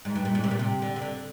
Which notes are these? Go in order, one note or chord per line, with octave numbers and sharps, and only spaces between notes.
G#2
G2
A#2
G#2
C3
A#2
C3
D3
C3
D3